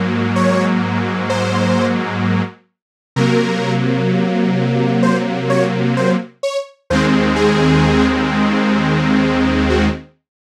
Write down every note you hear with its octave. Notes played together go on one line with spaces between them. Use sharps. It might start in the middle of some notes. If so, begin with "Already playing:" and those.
Already playing: G#2 F#3 A#3
C#5
C5
C3 F#3 A#3 A#4
C5
C#5
C5
C#5
D#2 D#3 G#3 C4 C5
G#4
F#4